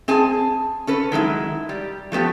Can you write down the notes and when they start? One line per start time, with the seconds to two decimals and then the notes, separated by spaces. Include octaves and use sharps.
0.08 C4 G#4 G#5 A5
0.87 C#4 A4 B4
1.12 D#3 F#3 G#3 E4
1.69 G3
2.12 F3 A3 B3 G4